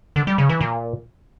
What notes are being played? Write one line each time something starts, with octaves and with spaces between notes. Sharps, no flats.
D3
G3
C#3
E3
A#2